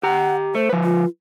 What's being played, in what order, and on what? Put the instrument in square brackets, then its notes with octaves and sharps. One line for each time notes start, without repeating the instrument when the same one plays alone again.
[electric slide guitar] G4 A#5 [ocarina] F#5
[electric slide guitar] A3 [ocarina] C5
[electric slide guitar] F3 B4
[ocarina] F4